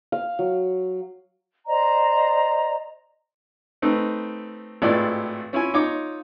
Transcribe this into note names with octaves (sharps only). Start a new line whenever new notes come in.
F5
F#3
C5 D5 D#5 A#5
A3 C4 D#4 B4
G#1 A2 E4 F4 B4 D5
C#4 E4 F4 G#5
D#4 F4 C#5 D6